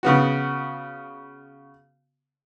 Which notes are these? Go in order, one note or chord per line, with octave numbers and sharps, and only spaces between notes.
C#3 B3 F#4